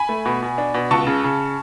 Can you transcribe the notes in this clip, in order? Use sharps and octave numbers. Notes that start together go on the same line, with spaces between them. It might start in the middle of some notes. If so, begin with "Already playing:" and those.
Already playing: G#5 B5
A3
B2
B2
D4
B2
C#2 A5 C#6
C#3
C#3